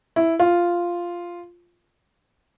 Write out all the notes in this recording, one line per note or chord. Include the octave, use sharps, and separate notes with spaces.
E4
F4